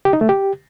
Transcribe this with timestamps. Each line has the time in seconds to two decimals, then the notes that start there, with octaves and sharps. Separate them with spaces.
0.05 G4
0.13 D#4
0.21 A3
0.29 G4